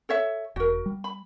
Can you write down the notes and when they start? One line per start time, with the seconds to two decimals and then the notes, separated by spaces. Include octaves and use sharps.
0.09 A4 C#5 E5
0.56 E1 F#4 A#4
0.86 G3
1.04 B5